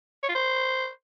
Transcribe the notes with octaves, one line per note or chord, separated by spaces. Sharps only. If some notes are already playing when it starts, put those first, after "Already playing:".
C#5
F4
C5